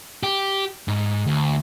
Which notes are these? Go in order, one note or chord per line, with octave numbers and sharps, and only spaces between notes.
G4
G#2
D2